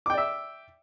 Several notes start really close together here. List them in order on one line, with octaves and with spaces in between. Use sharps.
D6 G5 D5 E5